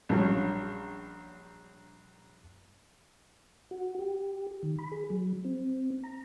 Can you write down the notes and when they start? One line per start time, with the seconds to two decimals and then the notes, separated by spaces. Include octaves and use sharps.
0.09 A#1 G2 F#3 C#4
3.71 F#4
3.99 G4
4.63 D#3
4.79 B5
4.92 G#4
5.10 F#3
5.45 C4
6.04 A#5